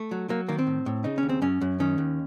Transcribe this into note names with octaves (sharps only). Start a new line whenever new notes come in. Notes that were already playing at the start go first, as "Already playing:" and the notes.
Already playing: A3
F#3
F#3 A#3
D#3 A#3
C4
A2
A2
C#3 D#4
C#4
D#2
C4
F#2 C#4
F#2
D#3 C#4
D#2